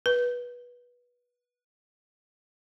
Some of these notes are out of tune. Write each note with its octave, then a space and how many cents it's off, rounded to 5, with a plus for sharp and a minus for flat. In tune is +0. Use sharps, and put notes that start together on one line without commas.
B4 -20